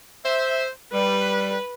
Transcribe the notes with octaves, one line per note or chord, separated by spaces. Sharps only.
C5 E5
G3 B4